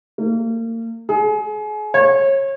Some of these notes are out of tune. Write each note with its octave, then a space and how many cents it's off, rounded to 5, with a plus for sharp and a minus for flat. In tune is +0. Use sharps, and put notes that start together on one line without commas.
A#3 -35
G#4 +35
C#5 -30